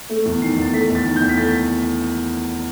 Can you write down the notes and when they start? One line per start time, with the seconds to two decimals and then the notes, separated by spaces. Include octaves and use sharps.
0.10 A3
0.26 E2
0.42 D#3 C7
0.57 E2 A6
0.74 A3 B6
0.90 E2 A6
1.06 D#3
1.16 G6
1.21 E2
1.29 B6
1.37 A3 A6